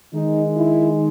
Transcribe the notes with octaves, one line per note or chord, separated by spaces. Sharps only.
D#3 G#3 D#4
E4